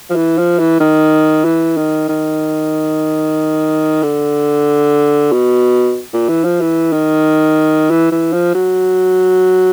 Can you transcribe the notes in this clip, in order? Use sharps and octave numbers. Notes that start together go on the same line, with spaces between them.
F3
E3
F3
E3
D#3
E3
D#3
D#3
D3
B2
A#2
E3
F3
E3
D#3
E3
E3
F3
F#3